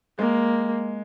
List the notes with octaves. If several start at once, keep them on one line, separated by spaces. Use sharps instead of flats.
G#3 A#3